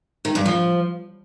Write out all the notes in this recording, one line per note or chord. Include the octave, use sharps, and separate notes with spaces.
D#3
G2
F3